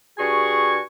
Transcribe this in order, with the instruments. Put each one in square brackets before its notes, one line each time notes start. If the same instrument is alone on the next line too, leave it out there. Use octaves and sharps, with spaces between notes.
[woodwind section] G2 F#4 G#4 G#5 C#6